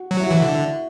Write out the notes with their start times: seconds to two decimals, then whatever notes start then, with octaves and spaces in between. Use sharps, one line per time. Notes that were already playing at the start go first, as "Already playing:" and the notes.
Already playing: F#4
0.11 F#3
0.20 E4
0.26 E3 F#4
0.42 D3